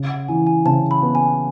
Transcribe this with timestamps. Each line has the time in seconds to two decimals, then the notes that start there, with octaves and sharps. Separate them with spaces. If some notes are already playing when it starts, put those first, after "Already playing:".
Already playing: C#3
0.09 F#5
0.28 E3 G#5
0.47 G#5
0.65 C#3 A5
0.91 B5
1.02 B3
1.15 G#5